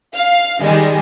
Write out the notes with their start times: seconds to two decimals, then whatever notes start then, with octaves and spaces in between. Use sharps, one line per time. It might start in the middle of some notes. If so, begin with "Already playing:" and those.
0.16 F5
0.62 D#3 G3 G#3